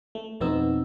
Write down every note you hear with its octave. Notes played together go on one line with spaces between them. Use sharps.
A3
F2 B2 B3 C4 D#4 E6